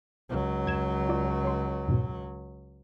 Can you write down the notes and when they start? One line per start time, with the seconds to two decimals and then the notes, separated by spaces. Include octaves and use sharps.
0.30 C#2 F#3
0.66 F2 G#6 E7
1.09 F4 D5
1.44 C#5 C6
1.88 E2 G#2 B2